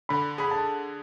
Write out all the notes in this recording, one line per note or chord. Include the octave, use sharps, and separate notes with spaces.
D3 B5
G#4 B5
A5